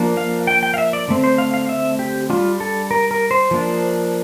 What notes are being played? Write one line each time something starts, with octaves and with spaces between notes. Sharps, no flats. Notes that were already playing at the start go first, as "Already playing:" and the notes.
Already playing: F3 A#3 D4
F5
G5
G5
F5
E5
D5
D3 A3 C4
C5
F5
F5
E5
G4
G3 D4 F4
A4
A#4
A#4
C5
F3 A#3 D4